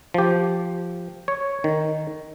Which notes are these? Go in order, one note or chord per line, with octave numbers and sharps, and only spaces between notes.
F3 G4
C#5
D#3